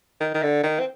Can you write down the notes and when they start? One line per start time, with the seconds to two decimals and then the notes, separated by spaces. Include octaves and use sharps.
0.20 D#3
0.34 D#3
0.43 D3
0.63 D#3
0.79 C4